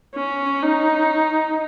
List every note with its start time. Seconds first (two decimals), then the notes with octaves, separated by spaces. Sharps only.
0.15 C#4
0.63 D#4